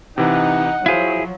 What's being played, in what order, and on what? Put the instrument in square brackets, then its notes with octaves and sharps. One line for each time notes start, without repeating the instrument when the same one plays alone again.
[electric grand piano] C3 E3 [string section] D#4 [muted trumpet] F#5
[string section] F3 F#3 [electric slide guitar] E4 G#4 [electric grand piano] C5 F5